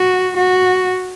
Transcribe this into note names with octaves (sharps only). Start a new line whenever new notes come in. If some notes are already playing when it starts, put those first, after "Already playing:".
Already playing: F#4
F#4